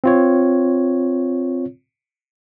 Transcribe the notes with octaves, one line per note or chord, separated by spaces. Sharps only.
C4 F4 C#5